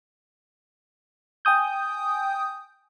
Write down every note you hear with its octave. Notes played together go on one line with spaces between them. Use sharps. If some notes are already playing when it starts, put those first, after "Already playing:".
G5 G#5 D#6 G6